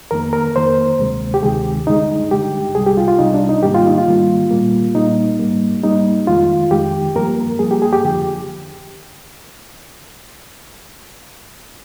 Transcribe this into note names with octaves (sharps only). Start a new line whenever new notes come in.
F2 D#3 A#3 A#4
A#4
F2 D#3 A#3 C5
D2 C3 D#3 G#3
G4
D2 C3 D#3 G#3 G#4
G2 D3 G#3 D#4
G2 D3 G#3 G4
C2 C3 G3 G#4
G4
F4
F4
C2 C3 G3 D#4
D4
D#4
G#2 D#3 G3 A#3 G4
F4
D#4
F4
G#2 D#3 G3 A#3
A#2 G3 A#3
A#2 G3 A#3 D#4
G#2 G3 A#3
G#2 G3 A#3 D#4
F2 D#3 G#3 F4
F2 D#3 G#3 G4
G2 F3 A#3 A#4
G2 F3 A#3 G#4
G4
G#4
G4
F2 D3 F3